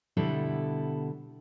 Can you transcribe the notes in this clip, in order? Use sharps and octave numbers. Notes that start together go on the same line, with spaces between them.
B2 D3 G3 B3 E4 A4